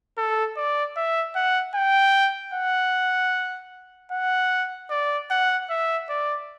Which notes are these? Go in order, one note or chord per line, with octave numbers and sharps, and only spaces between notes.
A4
D5
E5
F#5
G5
F#5
F#5
D5
F#5
E5
D5